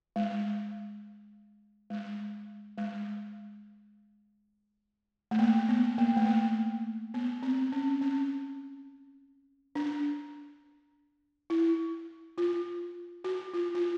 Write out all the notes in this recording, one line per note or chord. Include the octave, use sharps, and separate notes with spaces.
G#3
G#3
G#3
A3
A#3
B3
A#3
A3
A#3
B3
C4
C#4
C#4
D4
E4
F4
F#4
F4
F4